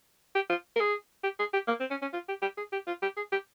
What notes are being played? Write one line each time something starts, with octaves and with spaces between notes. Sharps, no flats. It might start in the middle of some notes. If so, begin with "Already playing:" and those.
G4
F4
A#4
G#4
G4
G#4
G4
A#3
C4
C#4
C#4
F4
G4
G4
G#4
G4
F4
G4
G#4
G4